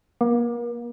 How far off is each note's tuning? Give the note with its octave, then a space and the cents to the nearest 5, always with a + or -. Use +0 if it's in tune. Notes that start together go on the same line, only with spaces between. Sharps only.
A#3 +35